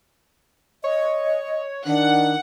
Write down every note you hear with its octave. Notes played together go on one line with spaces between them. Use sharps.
C#5 D#5
D#3 D4 F#5